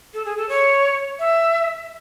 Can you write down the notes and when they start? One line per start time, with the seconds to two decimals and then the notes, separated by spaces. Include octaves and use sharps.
0.14 A4
0.26 G#4
0.37 A4
0.49 C#5
1.19 E5